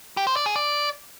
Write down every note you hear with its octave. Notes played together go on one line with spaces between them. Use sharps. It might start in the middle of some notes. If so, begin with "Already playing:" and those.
G4
C5
D5
G#4
D5